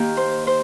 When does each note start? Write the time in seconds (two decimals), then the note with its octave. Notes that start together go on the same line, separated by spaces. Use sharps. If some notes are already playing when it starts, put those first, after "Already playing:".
Already playing: D#3 A#3 G4
0.17 C5
0.47 C5